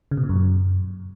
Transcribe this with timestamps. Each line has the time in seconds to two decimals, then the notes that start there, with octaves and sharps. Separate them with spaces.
0.11 C#3
0.17 B2
0.23 A#2
0.29 F#2